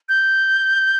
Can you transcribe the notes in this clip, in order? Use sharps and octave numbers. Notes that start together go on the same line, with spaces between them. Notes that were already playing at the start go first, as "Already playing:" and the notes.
G6